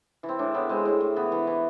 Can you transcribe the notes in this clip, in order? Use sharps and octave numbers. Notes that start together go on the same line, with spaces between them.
E3
C4
A2 D4
A2 B3
G#3 C4
A2
A2
E3 B3
E3
E3